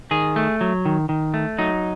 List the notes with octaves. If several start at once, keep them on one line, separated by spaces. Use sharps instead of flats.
D#3 G#4
A3
F#3
D#3
D#3
A3
F#3 D#4